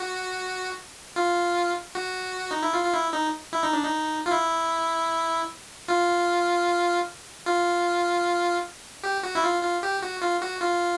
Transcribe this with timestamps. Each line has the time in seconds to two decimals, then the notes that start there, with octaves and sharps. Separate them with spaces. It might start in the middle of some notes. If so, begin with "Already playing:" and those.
Already playing: F#4
1.16 F4
1.95 F#4
2.51 D#4
2.63 E4
2.74 F4
2.84 F4
2.93 E4
3.13 D#4
3.53 E4
3.63 D#4
3.73 D4
3.84 D#4
4.26 F4
4.31 E4
5.88 F4
7.46 F4
9.04 G4
9.23 F#4
9.35 E4
9.44 F4
9.63 F4
9.83 G4
10.02 F#4
10.22 F4
10.41 F#4
10.61 F4